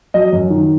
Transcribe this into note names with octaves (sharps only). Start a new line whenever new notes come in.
F#3 D#5
F#2
D#3